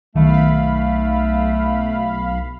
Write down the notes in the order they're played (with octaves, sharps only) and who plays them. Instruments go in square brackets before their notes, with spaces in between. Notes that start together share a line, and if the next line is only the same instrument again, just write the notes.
[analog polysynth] B1 F5 B5 [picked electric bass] D#3 [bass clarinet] A3